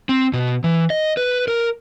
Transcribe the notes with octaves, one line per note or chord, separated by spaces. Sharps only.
C4
B2
E3
D#5
B4
A#4